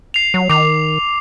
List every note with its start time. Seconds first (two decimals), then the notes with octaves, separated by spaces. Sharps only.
0.14 C7 F7
0.34 F#3
0.50 D#3 D6 F7